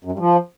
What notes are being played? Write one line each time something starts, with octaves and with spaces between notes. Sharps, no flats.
F#2
G2
F3